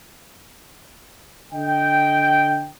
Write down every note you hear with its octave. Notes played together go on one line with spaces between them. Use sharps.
D3 D#5 G5